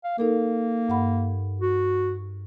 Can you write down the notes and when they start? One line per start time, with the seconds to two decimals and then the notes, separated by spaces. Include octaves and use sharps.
0.04 F5
0.18 A#3 D#4 A4 A#4
0.88 G2 F#5 B5
1.61 F#4